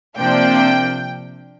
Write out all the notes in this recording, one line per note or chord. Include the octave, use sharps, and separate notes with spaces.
C3 F3 A#3 D4 G5